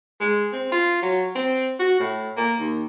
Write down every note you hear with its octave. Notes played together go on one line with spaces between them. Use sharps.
G#3
C4
F4
F#3
C4
F#4
A2
A#3
D#2